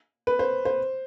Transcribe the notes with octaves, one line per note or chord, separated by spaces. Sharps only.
B4
C5
C5